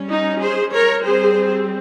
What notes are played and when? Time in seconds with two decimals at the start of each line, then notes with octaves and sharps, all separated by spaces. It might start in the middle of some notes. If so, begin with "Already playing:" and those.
Already playing: G3 C#4
0.09 D#4
0.40 G#4 C5
0.73 A#4 C#5
1.04 G3 C4 G#4 C5